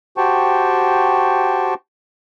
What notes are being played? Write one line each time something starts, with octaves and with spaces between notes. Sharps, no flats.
F#4 G4 C5 G5 A5 C#6